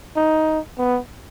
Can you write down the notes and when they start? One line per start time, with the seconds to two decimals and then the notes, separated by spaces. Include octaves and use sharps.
0.16 D#4
0.78 B3